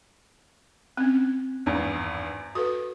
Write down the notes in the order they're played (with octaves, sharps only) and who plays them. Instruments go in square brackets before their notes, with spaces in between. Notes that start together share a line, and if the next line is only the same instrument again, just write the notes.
[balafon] C4 C#4
[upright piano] G#1 E2 G2
[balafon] F#4 A4 B4 [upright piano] D#6